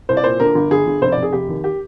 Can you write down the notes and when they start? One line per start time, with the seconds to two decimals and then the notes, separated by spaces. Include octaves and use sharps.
0.09 C2 C5
0.17 D5
0.24 A#2 C5
0.40 D3 A#4
0.55 G1
0.71 G1 G#4
0.87 G1
1.02 F1 C5
1.12 D5
1.17 F1
1.23 G#4
1.33 F1 G4
1.49 D#2
1.64 G4